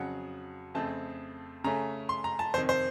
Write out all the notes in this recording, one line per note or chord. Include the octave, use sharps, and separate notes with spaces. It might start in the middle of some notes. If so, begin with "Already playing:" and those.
Already playing: F2 C#3 F#3 F#5
F2 C#3 A3 C4 A5
C#3 A3 C#4 A#5
C6
A#5
A5
F2 C3 D#3 C5
C5